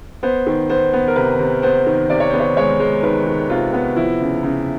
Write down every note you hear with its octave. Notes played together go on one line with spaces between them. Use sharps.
B3 C5
D#3
B3 C5
B3
A#4
C3 B4
C3
B3 C5
D#3
C3 D5
C#5
B3 C5
C#5
G#3 C#5
G#3
D#3 B4
D#3
C3 F4
B3
F3 E4
C#3
C#3